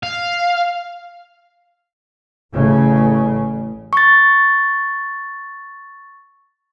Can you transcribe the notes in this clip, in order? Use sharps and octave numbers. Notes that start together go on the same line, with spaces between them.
F5
A1 C#3
C#6 A6